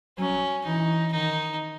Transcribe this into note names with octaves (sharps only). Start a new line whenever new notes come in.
F#3 C#4
E3 D#4
D#3 D#4